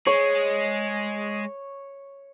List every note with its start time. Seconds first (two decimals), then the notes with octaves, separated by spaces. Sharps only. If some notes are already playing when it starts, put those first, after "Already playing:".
0.07 G#3 C#5